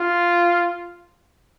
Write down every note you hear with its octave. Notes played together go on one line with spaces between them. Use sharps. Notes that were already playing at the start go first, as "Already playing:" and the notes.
Already playing: F4